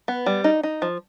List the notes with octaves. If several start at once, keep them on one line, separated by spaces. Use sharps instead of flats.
B3
G3
D#4
D#4
F3